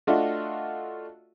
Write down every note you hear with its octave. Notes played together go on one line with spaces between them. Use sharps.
A3 D4 F4 F#4 D#5 E5